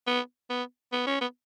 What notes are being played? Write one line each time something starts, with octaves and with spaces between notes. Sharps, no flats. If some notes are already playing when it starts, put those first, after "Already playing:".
B3
B3
B3
C#4
B3